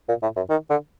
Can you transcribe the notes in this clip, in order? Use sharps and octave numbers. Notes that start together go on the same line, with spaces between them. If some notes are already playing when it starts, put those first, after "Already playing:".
A#2
A2
F#2
D#3
D3